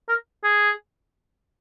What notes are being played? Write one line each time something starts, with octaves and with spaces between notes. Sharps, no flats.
A#4
G#4